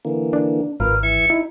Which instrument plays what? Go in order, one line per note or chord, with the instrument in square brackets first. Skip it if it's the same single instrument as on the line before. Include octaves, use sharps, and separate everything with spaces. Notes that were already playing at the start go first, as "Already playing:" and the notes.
[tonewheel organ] D3 E3 A#3
[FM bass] D4
[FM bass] G#1 [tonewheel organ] F4 A#4 B4 [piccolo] F6
[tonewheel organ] E3 E5 G#6 [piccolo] C#7
[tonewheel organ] D#4 [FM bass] E4